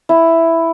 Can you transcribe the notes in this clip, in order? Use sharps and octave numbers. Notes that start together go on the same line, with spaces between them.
E4